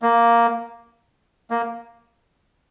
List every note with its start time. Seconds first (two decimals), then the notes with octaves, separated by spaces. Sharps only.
0.02 A#3
1.51 A#3